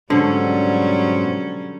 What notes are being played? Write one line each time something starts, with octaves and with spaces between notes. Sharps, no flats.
G#2 B2 D3 F#3 G3 C#4 C5